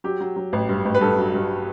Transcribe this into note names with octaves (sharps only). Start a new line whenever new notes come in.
F#3 G4
F#3
F#3
A1
G2
A1
B4
G2 A4
F#3
G2